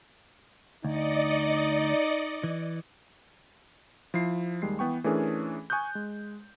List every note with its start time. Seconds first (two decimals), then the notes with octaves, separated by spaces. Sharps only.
0.84 D2 D#4 D5 D#5 C#7
2.44 E3
4.14 F3 E4 C7
4.62 D#2 G3 G#3 C7
4.79 E3 B3 G5 C#6
5.04 E3 A3 C#4 D4 G#4 A#4
5.70 G#5 C#6 D#6 F#6 G6
5.95 G#3